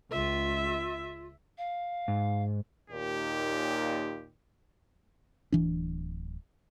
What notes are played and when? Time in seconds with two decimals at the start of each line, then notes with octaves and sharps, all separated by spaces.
0.12 C#2 F4 E5
1.58 F5
2.08 G#2
2.90 D#2 A#2 G4
5.52 D1 E3 D4